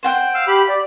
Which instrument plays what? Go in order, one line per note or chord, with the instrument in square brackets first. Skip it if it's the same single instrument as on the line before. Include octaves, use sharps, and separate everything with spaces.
[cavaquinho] C5 F#5 G5
[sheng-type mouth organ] F5 E6
G4 B5
D5